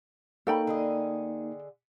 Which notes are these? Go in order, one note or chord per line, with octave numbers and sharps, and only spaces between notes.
A#3 D#4 A4 C#5 G5 B5
D3 G#4 D#5